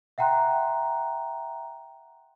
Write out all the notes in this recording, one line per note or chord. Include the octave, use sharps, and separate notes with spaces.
E5 F#5 G5 A#5 C6 F#6